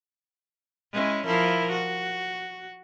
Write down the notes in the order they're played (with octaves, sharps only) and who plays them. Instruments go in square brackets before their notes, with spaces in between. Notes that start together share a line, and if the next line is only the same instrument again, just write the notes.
[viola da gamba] G#3 C#4 E4
F3 E4 A#4
F#4